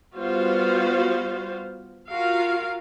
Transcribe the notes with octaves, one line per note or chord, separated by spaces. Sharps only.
G3 B3 F4 F#4 C5 F5
F4 F#4 A#4 F5